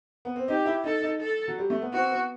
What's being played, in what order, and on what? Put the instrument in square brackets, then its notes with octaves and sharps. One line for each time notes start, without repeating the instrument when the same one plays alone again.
[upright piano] B3
C4
[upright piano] D#4 [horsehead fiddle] G4
[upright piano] E4
[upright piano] D#4 [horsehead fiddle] A4
[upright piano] D#4
[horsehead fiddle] A4
[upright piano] F#3
G3
A3
B3
[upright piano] C4 [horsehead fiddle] F#4
[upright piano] B3